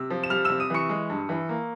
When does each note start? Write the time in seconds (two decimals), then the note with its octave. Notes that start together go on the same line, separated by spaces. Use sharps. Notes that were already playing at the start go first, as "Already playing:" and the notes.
Already playing: C3 E6
0.10 F3
0.23 E7
0.30 G3 F6 F7
0.45 C3 E6 E7
0.60 D#6 D#7
0.70 E3 C#6 C#7
0.89 G#3
1.09 G2
1.29 E3
1.49 A#3